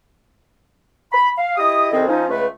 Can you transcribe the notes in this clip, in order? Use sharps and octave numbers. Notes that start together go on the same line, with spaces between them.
B5
F5
E4 G4 D#5 D#6
C2 D#3 C4 G#4 A4 D#5
F3 C#4 D#4
C#2 A3 B4